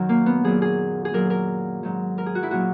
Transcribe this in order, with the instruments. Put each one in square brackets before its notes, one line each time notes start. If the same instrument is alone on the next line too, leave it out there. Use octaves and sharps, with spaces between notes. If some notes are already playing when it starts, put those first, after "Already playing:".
Already playing: [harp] F#2 D#3 F#3
A#3
B3
A#2 F#3 G#4
G#4
G#4
A#2 F#3 A#4
A#4
G#2 F#3
A#4
G#4
F#4
E4
A#2 F#3 F#4